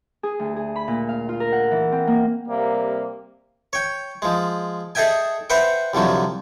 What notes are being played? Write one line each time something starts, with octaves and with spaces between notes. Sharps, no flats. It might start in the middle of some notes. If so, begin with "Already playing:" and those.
G#4
D2
G#4
B5
A#2
F5
F4
A#4
F#5
E3
C4
A#3
C3 G3 A#3
C#5 G5
F3 G#3
G#4 A4 D#5 E5 G5 G#5
B4 C5 E5 F#5 G5
C2 D3 F3 F#3